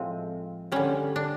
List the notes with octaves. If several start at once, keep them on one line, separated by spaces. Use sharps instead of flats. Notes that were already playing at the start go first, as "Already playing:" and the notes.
Already playing: A2 F3 G#3 C4
D3 G3 C#4
D4